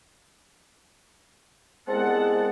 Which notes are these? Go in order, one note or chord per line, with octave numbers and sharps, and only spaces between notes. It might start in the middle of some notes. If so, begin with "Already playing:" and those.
C2 G#3 B3 C4 F#5 A5